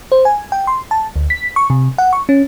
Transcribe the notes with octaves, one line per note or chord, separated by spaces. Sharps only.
C5
G#5
G5
C6
A5
D2
B6
C#6
C3
F#5
C#6
C#4